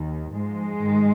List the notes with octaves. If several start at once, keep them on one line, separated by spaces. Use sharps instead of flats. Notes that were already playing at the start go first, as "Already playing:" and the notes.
Already playing: D#2 D#3
G#2 F3 G#3
G#2 D#3